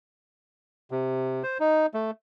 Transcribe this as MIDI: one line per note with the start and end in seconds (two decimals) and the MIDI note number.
0.91 1.43 48
1.43 1.58 72
1.60 1.86 63
1.94 2.11 57